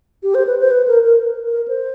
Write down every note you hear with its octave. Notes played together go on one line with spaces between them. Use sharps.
G4
C5
B4
C5
B4
A#4
A#4
A#4
C5